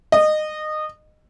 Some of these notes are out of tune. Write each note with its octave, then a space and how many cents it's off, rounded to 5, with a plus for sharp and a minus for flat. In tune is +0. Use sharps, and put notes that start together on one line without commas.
D#5 -20